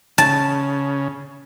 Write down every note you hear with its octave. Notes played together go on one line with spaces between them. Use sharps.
C#3 A5